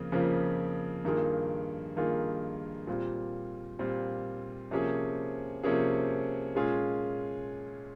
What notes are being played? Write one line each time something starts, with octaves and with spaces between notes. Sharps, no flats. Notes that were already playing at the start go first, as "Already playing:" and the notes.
Already playing: F2 C#3 A#3
F2 C#3 F3 A#3
G2 D#3 A#3 F4 G#4
G2 D#3 A#3 F4 G#4
A#2 G3 C4 F4
A#2 G3 C4 F4
C3 F3 A#3 C#4 G#4
C3 F3 A#3 C#4 G#4
A#2 G#3 C#4 F4 G#4